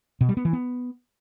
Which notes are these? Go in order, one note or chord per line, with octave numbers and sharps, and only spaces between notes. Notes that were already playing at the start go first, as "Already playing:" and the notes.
B2
G3
B3
E3
B3